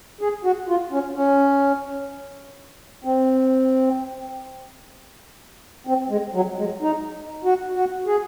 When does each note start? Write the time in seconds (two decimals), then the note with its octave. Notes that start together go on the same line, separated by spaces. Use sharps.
0.21 G#4
0.44 F#4
0.69 F4
0.92 C#4
1.16 C#4
3.04 C4
5.87 C4
6.10 G#3
6.34 F#3
6.58 G#3
6.82 D#4
7.44 F#4
7.75 F#4
8.07 G#4